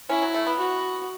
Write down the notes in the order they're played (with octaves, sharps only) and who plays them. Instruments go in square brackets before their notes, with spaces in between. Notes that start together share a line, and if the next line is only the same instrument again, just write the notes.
[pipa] C#4 [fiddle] E4
[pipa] F#3
A3
B3
[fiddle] F#4